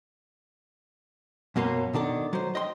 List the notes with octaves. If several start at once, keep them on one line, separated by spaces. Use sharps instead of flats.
F#2 B2 A#3 C#4 C6
B2 D#3 D4 A4
F#3 C5
D#5 G5 C6